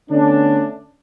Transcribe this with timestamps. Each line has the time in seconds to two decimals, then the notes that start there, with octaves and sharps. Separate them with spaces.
0.11 D3 A3 B3 C#4 D4